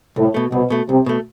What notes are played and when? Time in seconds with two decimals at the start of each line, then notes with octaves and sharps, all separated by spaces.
0.16 C2 A2
0.34 B2 A3
0.52 C2 B2
0.70 B2 A3
0.89 C2 C3
1.06 B2 A3